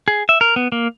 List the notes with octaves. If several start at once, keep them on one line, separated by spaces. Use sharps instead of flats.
G#4
E5
A#4
B3
A#3